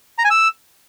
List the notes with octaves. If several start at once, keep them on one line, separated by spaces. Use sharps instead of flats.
A#5
G#5
E6